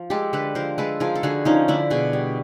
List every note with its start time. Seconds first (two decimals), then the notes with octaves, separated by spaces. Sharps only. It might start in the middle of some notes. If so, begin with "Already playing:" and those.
Already playing: F3
0.10 G#3 G4 A4
0.33 D3 A4 B4
0.55 F3 A#4 C5
0.78 G#3 A4 B4
1.00 F3 G#4 A#4
1.15 A4
1.23 D3 F#4 G#4
1.45 F3 C#4 D#4
1.68 D3 D4 E4
1.90 B2 F#4 G#4
2.13 G3